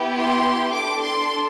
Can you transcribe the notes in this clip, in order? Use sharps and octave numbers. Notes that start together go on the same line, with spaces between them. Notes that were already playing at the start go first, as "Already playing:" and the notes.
Already playing: B3 E4 G4
C6
D4 A4 D6
C6